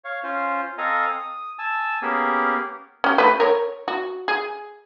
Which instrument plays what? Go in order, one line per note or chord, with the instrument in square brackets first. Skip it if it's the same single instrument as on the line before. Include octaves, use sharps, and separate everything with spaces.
[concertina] C#5 F5
C#4 F4 C5
C4 A4 D#5 F5 G#5 A#5
D#6
G#5 A5 E6
A#3 B3 C#4 G4 G#4 A#4
[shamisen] C#4 G4
A3 B4
A#4 C#5
F#4
G#4